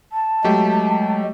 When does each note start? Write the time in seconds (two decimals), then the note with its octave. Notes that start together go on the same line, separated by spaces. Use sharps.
0.12 A5
0.44 F#3 G#3 A3 G4